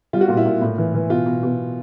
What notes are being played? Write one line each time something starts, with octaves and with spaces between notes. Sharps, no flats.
G3 F4
F#4
A#2 F4
E4
A#2
A2
E3
E3
B2 F4
B2
B2